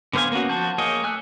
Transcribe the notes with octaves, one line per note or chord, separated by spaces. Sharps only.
D3 B3 C5 F5 G#5
A#3 B3 C#4 F#4
F3 F#4 A5 G6
A#3 G#4 C#5 D#5
A3 G#5 E6 F#6